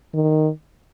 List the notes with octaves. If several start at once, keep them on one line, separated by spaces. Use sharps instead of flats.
D#3